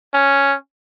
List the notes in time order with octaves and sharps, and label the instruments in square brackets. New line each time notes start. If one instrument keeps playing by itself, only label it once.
[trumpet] C#4